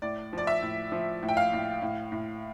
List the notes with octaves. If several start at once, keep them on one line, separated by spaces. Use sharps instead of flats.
A2 D5
F3 D5
E5
A2
F3
A2
G5
F5
A2
A2
A2